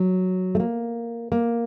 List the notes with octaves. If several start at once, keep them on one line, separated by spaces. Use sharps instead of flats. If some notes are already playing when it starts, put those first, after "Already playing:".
Already playing: F#3
A3
A#3
A#3